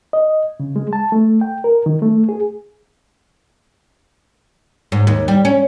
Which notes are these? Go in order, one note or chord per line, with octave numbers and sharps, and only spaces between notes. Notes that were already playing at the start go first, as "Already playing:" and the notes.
D#5
C#3
G#3
A5
A3
G5
A#4
D#3
A3
G#4
G#2
D#2
G3
C#4